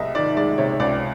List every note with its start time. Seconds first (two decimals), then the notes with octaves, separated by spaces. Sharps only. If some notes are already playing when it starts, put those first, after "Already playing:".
Already playing: C2 C3 D#5 E5
0.15 D#3 D5
0.37 G#3 D5
0.58 C3 C#5
0.80 C#2 D5